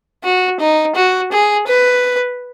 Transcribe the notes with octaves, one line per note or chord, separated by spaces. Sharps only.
F#4
D#4
F#4
G#4
B4